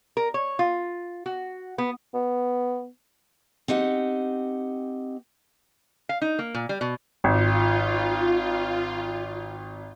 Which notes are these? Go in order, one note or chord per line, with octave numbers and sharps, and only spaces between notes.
A#4
C#5
F4
F#4
B3
B3
C4 D#4 G4 F#5
F5
D#4
A#3
A#2
G3
B2
G#1 F4